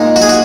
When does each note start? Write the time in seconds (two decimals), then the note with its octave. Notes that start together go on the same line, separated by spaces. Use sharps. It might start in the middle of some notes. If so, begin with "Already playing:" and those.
Already playing: A#2 G#3 D#4
0.16 F#4
0.22 G#4
0.29 F#4